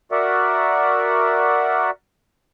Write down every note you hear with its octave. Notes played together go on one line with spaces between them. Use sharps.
F#4 A#4 D5 E5 F#5